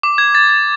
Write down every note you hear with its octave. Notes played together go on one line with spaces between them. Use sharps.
D6
G#6
A6
A6